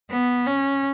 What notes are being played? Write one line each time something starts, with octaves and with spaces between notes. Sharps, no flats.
B3
C#4